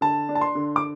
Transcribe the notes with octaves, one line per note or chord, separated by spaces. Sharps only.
D3 A5
D4
A5
C6
D3
D6